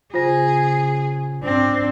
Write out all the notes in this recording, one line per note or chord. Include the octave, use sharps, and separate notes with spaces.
C#3 F4 G#4 C5 A#6
G#2 C4 D4